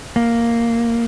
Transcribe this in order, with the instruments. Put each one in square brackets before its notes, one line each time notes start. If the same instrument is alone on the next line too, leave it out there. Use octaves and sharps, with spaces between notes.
[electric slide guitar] A#3